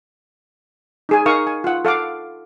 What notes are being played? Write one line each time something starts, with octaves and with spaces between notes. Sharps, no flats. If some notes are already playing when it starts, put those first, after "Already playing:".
D#4 G#4 G#5
D#4 A#4 F5 C#6 D#6
G#5
F4 F#5
A4 F5 F#5 D6